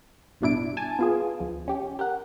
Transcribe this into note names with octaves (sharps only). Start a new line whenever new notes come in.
A1 G2 B2 D4 E4 D7
G#5 A5
B3 F4 G#4
D2 F3
C#4 G4
G4 A#4 F#5